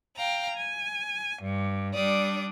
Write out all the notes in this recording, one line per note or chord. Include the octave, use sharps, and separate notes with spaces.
F5 G5 A#5
G#5
G2
G3 D4 D5 D#6